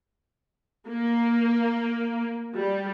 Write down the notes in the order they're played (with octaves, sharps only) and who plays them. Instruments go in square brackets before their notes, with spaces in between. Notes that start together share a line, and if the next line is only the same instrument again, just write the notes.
[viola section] A#3
G3